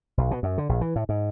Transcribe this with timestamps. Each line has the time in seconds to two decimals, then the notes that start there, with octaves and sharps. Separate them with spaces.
0.17 B1
0.31 B2
0.43 F#2
0.58 D3
0.69 A#1
0.81 E3
0.96 A2
1.09 G#2